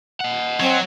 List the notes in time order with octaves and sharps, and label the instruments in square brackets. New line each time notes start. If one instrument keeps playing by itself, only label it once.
[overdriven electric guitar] D#5 F#5
[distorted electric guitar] F#3 [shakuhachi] C4